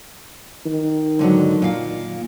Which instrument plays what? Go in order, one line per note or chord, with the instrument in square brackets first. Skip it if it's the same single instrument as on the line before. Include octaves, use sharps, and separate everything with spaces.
[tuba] D#3
[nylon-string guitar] G#2 D3 F#3
A#2 F5